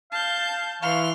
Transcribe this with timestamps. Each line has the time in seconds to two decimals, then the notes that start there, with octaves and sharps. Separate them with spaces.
0.12 F5 A5 G6
0.82 E3 C#5 F5 C6 F7